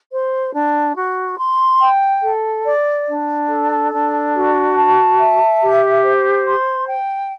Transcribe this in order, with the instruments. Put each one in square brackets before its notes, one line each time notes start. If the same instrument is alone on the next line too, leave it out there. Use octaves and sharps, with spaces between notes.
[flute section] C5
D4
F#4
C6
G5
A4
D5
D4
A4
D4
F#4
A5
E5
G4
C5
C6
G5